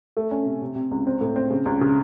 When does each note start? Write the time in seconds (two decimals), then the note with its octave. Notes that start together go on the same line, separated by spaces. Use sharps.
0.17 A3
0.31 C#4
0.46 C3
0.62 C3
0.76 C3
0.91 C#2
1.07 C4
1.21 A2
1.36 C4
1.50 C#3
1.66 C#2
1.81 C#3